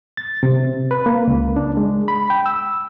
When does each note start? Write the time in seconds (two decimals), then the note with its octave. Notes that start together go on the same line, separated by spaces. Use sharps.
0.17 A6
0.43 C3
0.91 B4
1.06 A#3
1.27 C#2
1.56 D4
1.77 G#3
2.08 B5
2.30 G5
2.46 E6